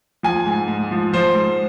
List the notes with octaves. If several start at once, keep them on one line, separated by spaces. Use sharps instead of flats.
F3 G#5
G#2
G#2
F3
F3 C5
G#2